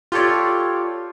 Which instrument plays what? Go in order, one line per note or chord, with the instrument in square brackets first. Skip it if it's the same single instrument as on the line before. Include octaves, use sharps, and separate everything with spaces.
[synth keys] F4 G4 A4 C#5 D5